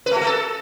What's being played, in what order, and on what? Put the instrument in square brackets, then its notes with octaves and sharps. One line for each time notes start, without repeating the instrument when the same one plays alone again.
[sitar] B4
A3
F#4
A3
A4